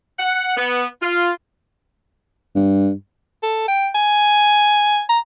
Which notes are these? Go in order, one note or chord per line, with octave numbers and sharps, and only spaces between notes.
F#5
B3
F4
G2
A4
G5
G#5
A#5